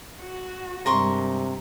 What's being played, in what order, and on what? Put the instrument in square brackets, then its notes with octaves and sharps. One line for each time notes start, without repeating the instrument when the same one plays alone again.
[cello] F#4
[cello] G2 G#3 [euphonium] C3 [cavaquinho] A#4 C6 C#6